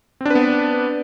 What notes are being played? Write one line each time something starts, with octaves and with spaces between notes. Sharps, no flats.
B3 C4 D4 B4